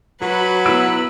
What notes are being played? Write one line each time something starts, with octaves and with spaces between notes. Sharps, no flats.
F#3 F#4 B4 B5
B3 E4 E6 D7